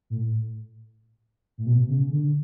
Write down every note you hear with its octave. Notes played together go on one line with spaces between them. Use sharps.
A2
A2
B2
C#3
D3